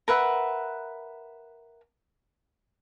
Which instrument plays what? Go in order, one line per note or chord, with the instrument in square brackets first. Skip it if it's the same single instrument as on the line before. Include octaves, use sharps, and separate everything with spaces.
[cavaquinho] A#4 B4 E5 F#5